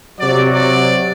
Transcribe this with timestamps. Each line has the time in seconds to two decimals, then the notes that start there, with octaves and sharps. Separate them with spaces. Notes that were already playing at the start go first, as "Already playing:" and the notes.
0.19 C3 F#3 D5
0.54 D5